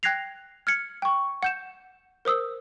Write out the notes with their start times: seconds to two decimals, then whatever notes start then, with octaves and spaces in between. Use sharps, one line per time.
0.03 G5 F#6 G#6 A#6 C7 F7
0.67 F6 G#6 C#7
1.02 G5 C#6
1.43 F#5 G6 E7
2.25 A#4 C5 D#6 E6